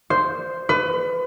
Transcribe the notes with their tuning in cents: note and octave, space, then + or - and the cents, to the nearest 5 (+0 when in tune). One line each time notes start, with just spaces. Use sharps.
C5 -5
B4 +30